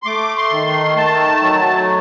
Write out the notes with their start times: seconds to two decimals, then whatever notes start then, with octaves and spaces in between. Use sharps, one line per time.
0.03 C6
0.06 A3 D6
0.37 C6
0.52 D#3
0.67 C6
0.97 A3 A5
1.42 F#3